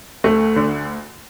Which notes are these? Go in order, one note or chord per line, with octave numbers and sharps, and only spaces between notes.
D2 A3
D3